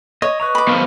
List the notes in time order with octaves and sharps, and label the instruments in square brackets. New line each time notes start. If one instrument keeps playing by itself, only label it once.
[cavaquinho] C#5 [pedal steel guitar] D#5
[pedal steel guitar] B4 D#5 A#5 [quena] C#6
[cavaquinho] B5 D6
[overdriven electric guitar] B2 F3